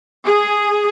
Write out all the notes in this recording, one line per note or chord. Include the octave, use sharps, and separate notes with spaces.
G#4